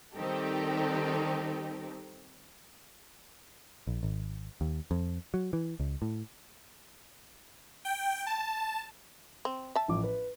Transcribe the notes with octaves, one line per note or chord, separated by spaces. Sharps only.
D#3 G3 C4 D#4 G4 A4
A#1
G#1
D#2
F2
F#3
E3
C#2
A2
G5
A5
C4
E5 A5
A1 F3 D6
B4